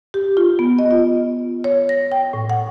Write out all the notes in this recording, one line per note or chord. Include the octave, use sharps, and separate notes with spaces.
G4
F4
B3
D#5
F4
C#5
A#6
G5
A2
F#5